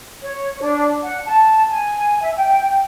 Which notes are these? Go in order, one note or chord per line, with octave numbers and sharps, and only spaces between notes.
C#5
D4
F#5
A5
G#5
E5
G5